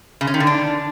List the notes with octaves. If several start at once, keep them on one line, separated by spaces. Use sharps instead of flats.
C#3
C#4
D#3
D3
D4